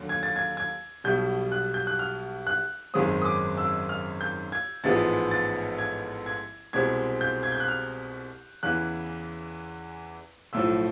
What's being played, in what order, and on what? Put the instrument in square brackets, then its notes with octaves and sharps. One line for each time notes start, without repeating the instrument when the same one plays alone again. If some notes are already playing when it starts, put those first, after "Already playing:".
Already playing: [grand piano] D#2 D3 F#3
G#6
A6
G#6
G#6
B1 B2 G3 G6
F#6
G6
F#6
F6
F#6
G#1 F#2 D#3 G#3 C4 D#6
D#6
D6
E6
F6
G6
G#6
A1 G#2 F3 G#3 B3 A6
A6
G#6
G#6
C2 B2 G#3 C4 G#6
G6
G#6
G6
F#6
F6
E2 C#3 E3 F#6
B1 A2 F3 E6